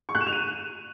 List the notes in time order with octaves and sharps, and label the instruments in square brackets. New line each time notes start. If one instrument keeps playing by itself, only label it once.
[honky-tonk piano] C#6
F#6
E7
F7
D#7